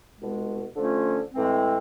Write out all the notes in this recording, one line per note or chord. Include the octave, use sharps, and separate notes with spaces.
C2 B2 G#3
D3 F3 A3 C#4 F4
A2 E3 G#3 C4